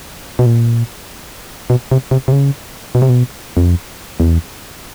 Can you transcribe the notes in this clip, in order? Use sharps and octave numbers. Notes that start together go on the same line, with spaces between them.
B2
A#2
B2
C3
C3
C3
C#3
B2
C3
B2
F2
E2